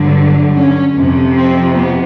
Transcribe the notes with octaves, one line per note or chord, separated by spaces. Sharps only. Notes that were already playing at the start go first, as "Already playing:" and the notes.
Already playing: G2 D3 F#3
C#4
F2 C3 F3
C4
B3